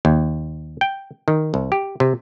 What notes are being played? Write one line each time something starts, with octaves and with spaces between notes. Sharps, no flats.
D#2
G5
D#3
C2
G4
C3